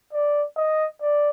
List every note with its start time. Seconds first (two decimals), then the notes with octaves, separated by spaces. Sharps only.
0.13 D5
0.57 D#5
1.02 D5